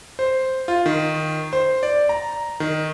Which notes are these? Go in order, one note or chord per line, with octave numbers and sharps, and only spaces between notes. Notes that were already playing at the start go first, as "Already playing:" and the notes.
C5
F4
D#3
C5
D5
A#5
D#3